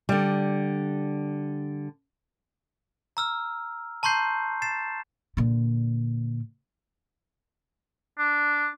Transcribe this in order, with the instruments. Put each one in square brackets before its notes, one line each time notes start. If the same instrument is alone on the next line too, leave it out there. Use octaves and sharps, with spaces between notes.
[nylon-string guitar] D3 G3
[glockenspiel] A#5 E6 F6
A5 A#5 C6 C#6 G6 C7
A6 C7 E7
[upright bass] A#2 D3
[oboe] D4